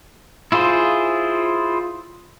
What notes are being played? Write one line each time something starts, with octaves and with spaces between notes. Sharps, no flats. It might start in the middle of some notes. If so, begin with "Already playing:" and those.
E4 F4 G#4 C5